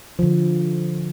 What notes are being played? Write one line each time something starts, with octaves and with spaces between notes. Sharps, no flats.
D3 F3